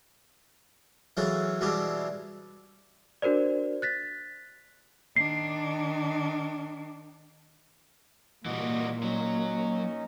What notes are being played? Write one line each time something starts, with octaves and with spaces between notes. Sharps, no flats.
E3 F#3 G#3 A4 C#5 F5
B2 E3 G3 G#3 C4 G4
D4 F#4 A#4 C5 D5
F#6 A6 B6
D#3 D4 C7
A#2 E3 G3 A#3 F#4 D#5 D6
F#3 C#4 D#4